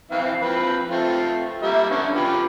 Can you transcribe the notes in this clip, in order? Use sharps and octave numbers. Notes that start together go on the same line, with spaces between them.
E3 C4 F5
F3 C4 B4
A3 C4 F4
G3 A#3 E5
D3 B3 C#4
F4 G4 B4